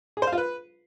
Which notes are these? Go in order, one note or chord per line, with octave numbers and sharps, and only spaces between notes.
G#4
C5
F5
F4
B4